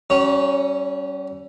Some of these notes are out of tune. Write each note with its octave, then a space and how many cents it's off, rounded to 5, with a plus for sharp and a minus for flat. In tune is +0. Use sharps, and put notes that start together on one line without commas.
G3 -45 C#4 +0 C#5 +0